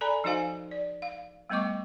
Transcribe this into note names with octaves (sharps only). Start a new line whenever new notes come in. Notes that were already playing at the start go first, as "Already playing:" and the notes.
A4 D5 G#5 A#5 B5
F3 D#4 F#4 C5 F5 G#5
D5
F5
G3 A3 B3 D#5 C#6 D6